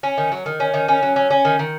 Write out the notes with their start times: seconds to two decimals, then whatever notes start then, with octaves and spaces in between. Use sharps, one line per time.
0.03 C#4
0.18 D#3
0.32 F#3
0.46 D#3
0.60 C#4
0.74 D#3
0.88 C#4
1.03 F#3
1.16 C#4
1.30 C#4
1.45 D#3
1.59 D#3